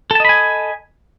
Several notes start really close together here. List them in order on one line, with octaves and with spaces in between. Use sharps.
A4 A5 D#5 B5 G#5